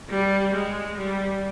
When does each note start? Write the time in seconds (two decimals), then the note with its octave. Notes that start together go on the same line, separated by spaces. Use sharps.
0.09 G3
0.54 G#3
0.98 G3